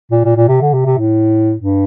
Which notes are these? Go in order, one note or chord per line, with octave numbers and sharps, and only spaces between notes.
A#2
A#2
A#2
C3
D3
C3
C3
A2
G2